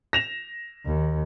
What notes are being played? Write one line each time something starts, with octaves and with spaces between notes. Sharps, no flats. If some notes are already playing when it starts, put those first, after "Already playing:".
A#6 E7 F7
D#2